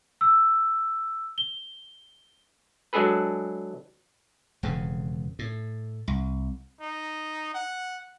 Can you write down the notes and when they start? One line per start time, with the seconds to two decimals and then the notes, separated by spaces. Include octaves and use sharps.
0.21 E6
1.38 G7
2.93 F#3 G#3 D4 G#4 A4 B4
4.63 E1 F2 C#3
5.39 A2
6.08 C2
6.81 D#4
7.54 F#5